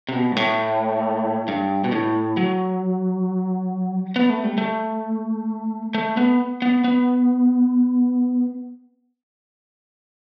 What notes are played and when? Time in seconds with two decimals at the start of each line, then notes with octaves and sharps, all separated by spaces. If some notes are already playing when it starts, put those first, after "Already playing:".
0.09 C3
0.13 B2
0.32 G2
0.36 A2
1.48 G2
1.84 B2
1.92 A2
2.37 F#3
4.16 B3
4.30 A3
4.44 G3
4.58 A3
5.95 A3
6.17 B3
6.62 B3
6.84 B3